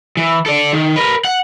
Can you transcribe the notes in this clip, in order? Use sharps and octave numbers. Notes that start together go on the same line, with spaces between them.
E3
A4 D5
D#3
A#4 B4
F#5